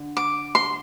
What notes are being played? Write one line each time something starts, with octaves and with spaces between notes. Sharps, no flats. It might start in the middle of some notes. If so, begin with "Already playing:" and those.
Already playing: D3
D6
C6